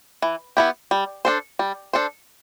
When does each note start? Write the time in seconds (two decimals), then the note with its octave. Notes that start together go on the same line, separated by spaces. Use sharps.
0.22 E3
0.57 B3 E4 G4
0.91 G3
1.25 D4 A4 C5
1.59 G3
1.93 D4 A4 C5